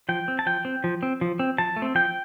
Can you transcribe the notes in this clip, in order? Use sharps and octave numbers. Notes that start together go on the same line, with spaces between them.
F3 G5
C4
A5
F3 G5
C4
F3
C4
F3
C4
F3 A5
A3
C4
F3 G5